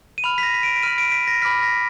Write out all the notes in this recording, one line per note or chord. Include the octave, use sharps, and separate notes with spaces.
D#7
B5 F6 F7
B6
A#6
B6
D7
B5 F6 D#7
D7
B6
A#6
B5 D6 F6 B6
A#6